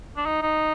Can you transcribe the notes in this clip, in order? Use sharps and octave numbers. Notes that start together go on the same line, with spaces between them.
D4
D#4
D#4